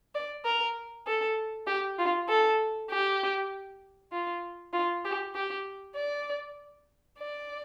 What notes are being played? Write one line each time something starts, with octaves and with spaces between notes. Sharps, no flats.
D5
A#4
A4
G4
F4
A4
G4
F4
F4
G4
G4
D5
D5